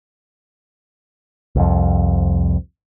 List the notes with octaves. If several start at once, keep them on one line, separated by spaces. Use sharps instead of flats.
C2 F2